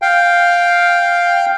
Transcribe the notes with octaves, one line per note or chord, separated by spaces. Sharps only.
F5 G5